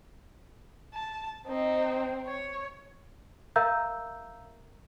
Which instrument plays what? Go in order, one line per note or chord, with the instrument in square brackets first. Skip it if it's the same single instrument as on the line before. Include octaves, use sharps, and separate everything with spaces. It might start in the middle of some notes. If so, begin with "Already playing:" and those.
[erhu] A5
[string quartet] C4 [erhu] D#4
[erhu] C#5
[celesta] A#4 E5 F5 A#5 E6 G6